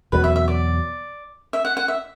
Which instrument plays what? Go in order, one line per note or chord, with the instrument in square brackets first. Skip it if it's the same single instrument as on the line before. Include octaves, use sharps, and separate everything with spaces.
[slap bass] E2 B2 F#3 [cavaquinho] B4
[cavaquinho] E5
E5
D5
E5
F#5
F#5
E5